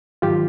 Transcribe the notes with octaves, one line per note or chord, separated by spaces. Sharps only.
G#2 D#3 F#3 F4 G4